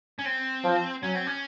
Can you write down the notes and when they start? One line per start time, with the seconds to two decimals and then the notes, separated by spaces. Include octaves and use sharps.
0.19 C#4
0.25 C4
0.64 F3
1.03 F#3 C#4
1.15 C4
1.27 C#4